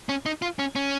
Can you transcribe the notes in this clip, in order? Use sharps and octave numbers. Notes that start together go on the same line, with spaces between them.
C#4
D#4
F4
C#4
C#4